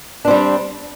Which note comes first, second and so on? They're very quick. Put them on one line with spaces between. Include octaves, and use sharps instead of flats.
D4 C4 G3